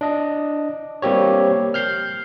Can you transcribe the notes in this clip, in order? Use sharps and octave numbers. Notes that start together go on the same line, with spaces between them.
D4 D#5
G3 A#3 C4 G4 C#5
F6 G6 C7